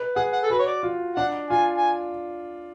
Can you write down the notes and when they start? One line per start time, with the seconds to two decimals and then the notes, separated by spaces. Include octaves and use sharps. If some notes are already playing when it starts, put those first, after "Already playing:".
Already playing: B4
0.16 G#4 F#5
0.33 F#5
0.43 A4
0.50 F#4 B4
0.59 C#5
0.67 D5
0.83 F4
1.16 D4 F#5
1.50 F4 G#5
1.78 G#5